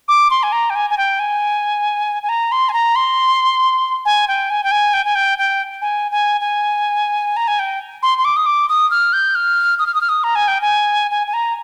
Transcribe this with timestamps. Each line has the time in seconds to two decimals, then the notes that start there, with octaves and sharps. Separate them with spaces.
0.08 D6
0.30 C6
0.43 G#5
0.52 A#5
0.70 G5
0.75 G#5
0.90 G#5
0.98 G5
1.20 G#5
2.23 G#5
2.29 A#5
2.52 C6
2.69 G#5
2.73 A#5
2.96 C6
4.05 G#5
4.28 G5
4.50 G#5
4.64 G5
4.71 G#5
4.93 G5
5.05 G#5
5.15 G5
5.38 G5
5.81 G#5
6.11 G#5
6.41 G#5
7.36 A#5
7.48 G#5
7.59 G5
8.03 C6
8.18 C6
8.25 D6
8.36 D#6
8.46 D6
8.69 D#6
8.91 F6
9.13 G6
9.35 F6
9.79 D#6
9.86 F6
9.94 D#6
10.01 F6
10.09 D#6
10.24 A#5
10.35 G#5
10.48 G5
10.61 G#5
11.11 G#5
11.27 G#5
11.34 A#5